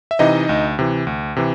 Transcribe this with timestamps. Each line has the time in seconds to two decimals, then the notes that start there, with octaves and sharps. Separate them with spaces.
0.11 E5
0.19 C3 E3 D#4 D#5
0.49 D2
0.79 C3 E3
1.07 D2
1.36 C3 E3